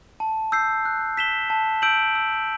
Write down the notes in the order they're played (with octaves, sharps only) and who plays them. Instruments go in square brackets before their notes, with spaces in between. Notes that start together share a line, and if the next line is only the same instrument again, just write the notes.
[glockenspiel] A5
E6 G6 C7
F#6
B6 E7 G7
A5
E6 G6 D7 F#7
E6